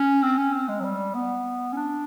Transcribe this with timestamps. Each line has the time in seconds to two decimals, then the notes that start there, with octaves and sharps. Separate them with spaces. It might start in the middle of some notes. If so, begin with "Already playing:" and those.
Already playing: C#4
0.23 C4
0.38 C#4
0.53 C4
0.68 G#3
0.80 F#3
0.84 G3
1.15 B3
1.73 C#4
1.76 D4